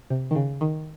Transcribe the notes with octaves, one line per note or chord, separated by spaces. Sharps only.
C3
D#3
C#3
D#3